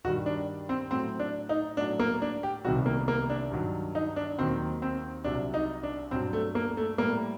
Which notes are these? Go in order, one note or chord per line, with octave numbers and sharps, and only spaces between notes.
G2 D#3 G3 F#4
D4
C4
A2 F#3 C4
D4
D#4
A2 F#3 D4
A#3
D4
G4
C2 C3 D#3 G3 F#4
A#3
A#3
D4
G2 D#3 F#3
D#4
D4
D#2 D#3 F#3 C4
C4
C2 C3 F#3 D4
D#4
D4
G2 F#3 C4
A3
A#3
A3
A2 G3 A#3